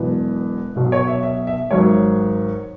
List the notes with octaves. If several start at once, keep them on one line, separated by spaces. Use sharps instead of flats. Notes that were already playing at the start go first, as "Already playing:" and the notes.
Already playing: E1 E2 B2 F#3 B4
B1 B2 F#3
C#5
E5
E5
E5
G#1 G#2 F#3 C#5